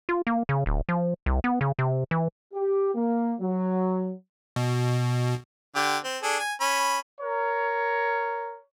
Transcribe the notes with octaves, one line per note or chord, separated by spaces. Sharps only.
F4
A#3
C#3
D1
F3
C2
B3
C#3
C3
E3
G4
A#3
F#3
B2
D3 G4
C4
D4 G#4 A4
G#5
C#4 B5
A#4 C#5